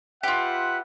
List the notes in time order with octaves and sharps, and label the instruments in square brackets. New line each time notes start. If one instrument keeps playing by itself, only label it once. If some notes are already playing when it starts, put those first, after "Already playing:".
[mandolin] F4 G4 [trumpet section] B4 E5 F#5